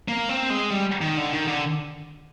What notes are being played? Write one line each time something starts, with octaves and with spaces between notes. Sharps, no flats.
A#3
C4
G#3
G3
D#3
D3
D#3
D3